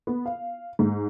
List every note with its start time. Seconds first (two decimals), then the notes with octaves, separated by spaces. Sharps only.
0.07 B3
0.26 F5
0.79 G#2